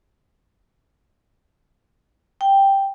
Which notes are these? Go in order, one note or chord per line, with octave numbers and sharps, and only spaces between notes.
G5